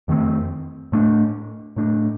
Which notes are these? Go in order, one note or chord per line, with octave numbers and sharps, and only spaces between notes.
F2 D#3 A3 C4
A2 A3 D4
A2 A3 D4